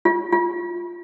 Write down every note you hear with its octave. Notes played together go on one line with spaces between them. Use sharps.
F4
F4